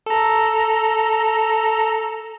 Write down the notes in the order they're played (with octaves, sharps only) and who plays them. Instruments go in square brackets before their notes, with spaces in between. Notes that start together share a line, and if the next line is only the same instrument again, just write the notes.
[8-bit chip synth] A4 A#5